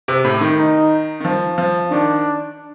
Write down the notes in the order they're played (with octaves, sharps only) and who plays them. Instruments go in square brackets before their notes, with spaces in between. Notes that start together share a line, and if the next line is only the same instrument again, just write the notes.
[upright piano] C3
A2
D#3
[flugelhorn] D#4
[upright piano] D#3
F3
F3
[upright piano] D#3 [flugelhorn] D4